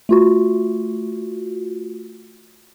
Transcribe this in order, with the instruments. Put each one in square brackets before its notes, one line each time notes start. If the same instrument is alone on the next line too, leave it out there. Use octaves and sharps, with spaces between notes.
[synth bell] A3 F4 F#4